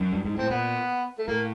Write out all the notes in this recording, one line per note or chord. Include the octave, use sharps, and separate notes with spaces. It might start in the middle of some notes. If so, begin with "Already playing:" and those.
F#2
G2
G#2
A2 C4
A#2 B3
A3
A2 A#3